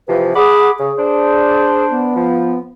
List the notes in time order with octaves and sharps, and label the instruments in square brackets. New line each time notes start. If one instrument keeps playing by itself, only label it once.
[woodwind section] C3 E3 F3 [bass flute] B4
[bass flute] G#4 [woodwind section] F#5 B5 D6
[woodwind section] C#3 [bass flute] G#4
[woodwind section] D4 C5
[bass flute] B3
[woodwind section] F3